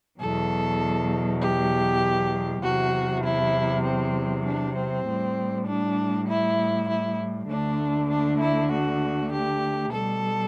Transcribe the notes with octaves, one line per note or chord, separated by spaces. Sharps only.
E2 B2 F#3 A4
G4
E2 C3 F#3 F#4
E4
C4
D4
C4
A2 G3
D4
E4
E4
D2 D3 A3 D4
D4
E4
F#4
G4
B2 G3 A4